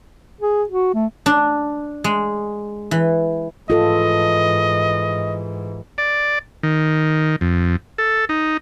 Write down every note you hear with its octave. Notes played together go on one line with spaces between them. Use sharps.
G#4
F#4
A3
D4
G#3
E3
G#2 E3 F4 A4 D#5
D5
D#3
F2
A4
D#4